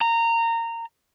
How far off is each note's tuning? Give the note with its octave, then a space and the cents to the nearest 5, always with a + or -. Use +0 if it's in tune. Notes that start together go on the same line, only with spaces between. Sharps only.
A#5 -20